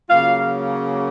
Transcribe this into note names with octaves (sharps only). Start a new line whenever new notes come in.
C#3 F#3 A#3 F4 F5